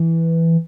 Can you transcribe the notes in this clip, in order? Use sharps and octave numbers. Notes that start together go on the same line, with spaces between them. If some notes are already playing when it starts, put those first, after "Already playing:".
Already playing: E3